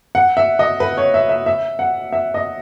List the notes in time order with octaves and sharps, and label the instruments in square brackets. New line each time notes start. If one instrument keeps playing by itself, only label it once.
[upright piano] F#5
E5
D#5
B4
C#5
E5
E5
E5
F#5
E5
D#5